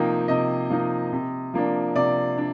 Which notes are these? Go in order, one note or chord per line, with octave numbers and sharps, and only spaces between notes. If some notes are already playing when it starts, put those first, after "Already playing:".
Already playing: C3 F3 A#3 D#4 G5
C3 D#5
F3 A#3 D#4
C3
F3 A#3 D4
C3 D5
D4